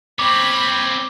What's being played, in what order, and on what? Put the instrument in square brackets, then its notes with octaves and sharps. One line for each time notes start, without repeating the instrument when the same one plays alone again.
[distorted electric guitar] C4 C#5 [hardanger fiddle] B5 [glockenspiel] D6